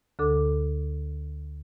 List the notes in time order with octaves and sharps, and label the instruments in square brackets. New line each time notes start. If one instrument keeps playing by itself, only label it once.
[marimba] D2 D3 A4 D6